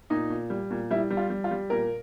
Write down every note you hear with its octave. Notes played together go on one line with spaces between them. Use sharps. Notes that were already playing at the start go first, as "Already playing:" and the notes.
A#2 D#4
A#2
G3
A#2
G3 E4
G3
F4
G3
F4
G3
A#2 A#4